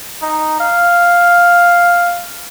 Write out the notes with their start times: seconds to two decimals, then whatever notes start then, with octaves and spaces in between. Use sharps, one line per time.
0.23 D#4
0.60 F5